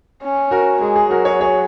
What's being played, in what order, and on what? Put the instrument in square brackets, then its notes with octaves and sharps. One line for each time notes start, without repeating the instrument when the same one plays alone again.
[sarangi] C#4
[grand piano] F#4 A#4
[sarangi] G#3 [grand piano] G#4
[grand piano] G#4
[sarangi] F#3 [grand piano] F#4 A#4
[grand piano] G#4 C#5
G#4 C#5